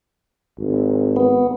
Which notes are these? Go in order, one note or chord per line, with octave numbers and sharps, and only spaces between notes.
G#1
B3